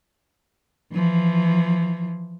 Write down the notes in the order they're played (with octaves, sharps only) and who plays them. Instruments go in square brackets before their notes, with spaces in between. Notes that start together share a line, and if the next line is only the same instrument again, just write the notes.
[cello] E3 F3